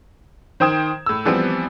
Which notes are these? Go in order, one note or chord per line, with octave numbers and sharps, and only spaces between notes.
D#3 C5 G5 D#6 G#6 E7
A2 E6
E3 F3 G3 B3 C4